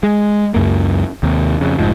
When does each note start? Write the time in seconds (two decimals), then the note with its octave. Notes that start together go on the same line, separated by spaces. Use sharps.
0.03 G#3
0.54 C#2 F#2 A#3
1.23 D#2 C3
1.60 F2 C#3
1.78 F1 G#2 F3